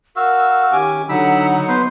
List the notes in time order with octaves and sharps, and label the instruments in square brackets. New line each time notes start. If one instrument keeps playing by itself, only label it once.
[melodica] F#4 F5 [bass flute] A#4 [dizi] E6
[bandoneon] D#3 C#4 D6 [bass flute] G4 [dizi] G#5
[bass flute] D3 [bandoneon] F#3 D#4 [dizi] F#5 [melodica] B5 E6
[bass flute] B3 [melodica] B4 C5 C6